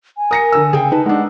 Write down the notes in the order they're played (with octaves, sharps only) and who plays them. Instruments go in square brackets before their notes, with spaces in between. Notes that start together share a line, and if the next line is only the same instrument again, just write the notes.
[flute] G#5
[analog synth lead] A#4 [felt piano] D#6 A#6 C#7
[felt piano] D3 E6
[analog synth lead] C#3 [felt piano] G#4 G5
[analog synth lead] D#4 [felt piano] B4 [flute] A5
[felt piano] G#3 D4 [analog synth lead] D#4 [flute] F#5